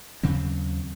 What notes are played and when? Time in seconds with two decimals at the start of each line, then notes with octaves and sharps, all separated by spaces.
0.23 D#2 C#3 F#3 C4